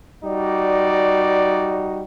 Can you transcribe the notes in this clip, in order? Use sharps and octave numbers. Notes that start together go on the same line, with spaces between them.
G3 D#4 F#4 D5